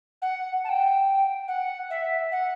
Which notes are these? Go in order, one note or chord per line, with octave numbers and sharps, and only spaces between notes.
F#5
A5
G5
F#5
E5
F#5